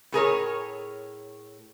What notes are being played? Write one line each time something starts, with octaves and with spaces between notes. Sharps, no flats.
A2 G#4 A#4 C#5